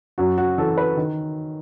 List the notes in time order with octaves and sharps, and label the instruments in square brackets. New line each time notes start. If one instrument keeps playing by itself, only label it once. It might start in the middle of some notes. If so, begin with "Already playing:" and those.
[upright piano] F#2 F#4
F#4
E3 A4
B4
D#3